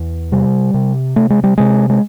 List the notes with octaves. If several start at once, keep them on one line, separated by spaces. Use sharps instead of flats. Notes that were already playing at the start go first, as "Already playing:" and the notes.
Already playing: E2
C3 G3
C3
C3 A3
G#3
G3
C3 G#3
G#3